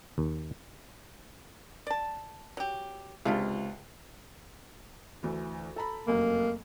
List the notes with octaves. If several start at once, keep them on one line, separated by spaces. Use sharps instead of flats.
D#2
D5 A5
F#3 G4
C#2 C3 G#3 D4 E4 F4
D2 E3
A4 A#5 B5
F1 F#2 F#3 A#3